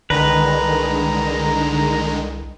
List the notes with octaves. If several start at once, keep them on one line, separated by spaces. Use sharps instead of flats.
C2 D3 D#3 G#3 B4 A#5